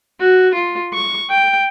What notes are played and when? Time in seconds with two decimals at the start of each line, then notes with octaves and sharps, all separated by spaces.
0.21 F#4
0.55 F4
0.94 C#6
1.30 G5